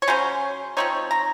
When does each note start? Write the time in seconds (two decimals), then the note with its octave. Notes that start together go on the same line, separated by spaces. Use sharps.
0.02 C#5
0.08 C#3 F#3 C#4 C5
0.77 F3 C4 D#4 C#5
1.11 A#5